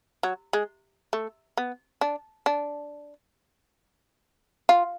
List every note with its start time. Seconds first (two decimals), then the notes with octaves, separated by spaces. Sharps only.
0.23 F#3
0.53 G#3
1.13 A3
1.57 B3
2.01 D4
2.46 D4
4.69 F4